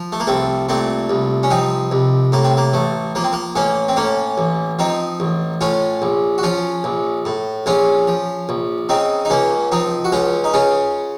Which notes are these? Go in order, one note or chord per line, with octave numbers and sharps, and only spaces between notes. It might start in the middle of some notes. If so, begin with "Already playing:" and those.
Already playing: F3
A3
A#3
C2 A3 C4
A#2 A3 C4
C2
C#4
F3 C4 D#4
C2
A2 A#3
C4
A#3
A1 A3
F3 A#3
C4
A#3
A1 A#3 C#4
C4
A2 A#3 C#4
A1
F3 C4 D#4
A1
A2 C#4 F4
A#1
F#4
F3 C#4 F4
A#1
A2
A#1 C#4 F4
F3
A#1
C#3 C4 D#4
D#4
C#2 A#3 C#4
F3 C4 D#4
F#4
C#2 C#4 F4
D#4
C#3 C#4 F4